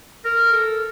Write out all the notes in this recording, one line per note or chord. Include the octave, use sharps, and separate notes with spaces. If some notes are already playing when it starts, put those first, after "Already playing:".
A#4
A4